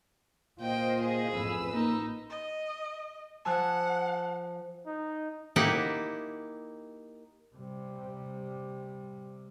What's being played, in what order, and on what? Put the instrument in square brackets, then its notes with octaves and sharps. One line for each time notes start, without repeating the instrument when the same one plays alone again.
[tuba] A#2 [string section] F4 C5 D#5 [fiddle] G5
[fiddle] G#4
[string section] A1 B4 E6 [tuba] F2
[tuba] A#3 [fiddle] D#4
[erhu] D#5
[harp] F3 G#5 [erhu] F#5 [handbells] A5 E6 F#6
[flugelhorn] D#4
[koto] A#3 D#4 E4 G4 F#5 G5
[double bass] C3 G3